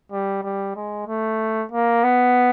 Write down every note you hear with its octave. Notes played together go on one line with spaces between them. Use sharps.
G3
G3
G#3
A3
A#3
B3